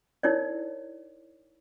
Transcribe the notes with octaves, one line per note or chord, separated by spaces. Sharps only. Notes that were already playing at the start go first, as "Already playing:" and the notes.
D#4 E4 A#4 C#5 D5